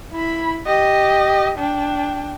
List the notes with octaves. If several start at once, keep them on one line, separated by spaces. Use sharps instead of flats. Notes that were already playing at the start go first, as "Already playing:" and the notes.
E4 B5
G4 D#5
D4 G5